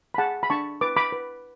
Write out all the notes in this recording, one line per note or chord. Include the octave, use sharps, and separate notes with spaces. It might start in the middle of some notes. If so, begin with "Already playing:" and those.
B5
G#4 F#5 A5
B5
D4 A5 C#6
B4 D6
B5 D6
B4